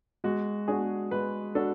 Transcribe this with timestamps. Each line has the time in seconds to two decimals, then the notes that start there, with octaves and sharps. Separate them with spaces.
0.24 G#3 F#4
0.68 D4 F#4 G#4
1.11 G#3 B4
1.55 D4 F#4 A4